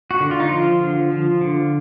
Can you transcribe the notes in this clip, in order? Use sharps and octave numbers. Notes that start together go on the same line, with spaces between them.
F#4
D3
F4
D#4
F3 F4
D3
F3
D3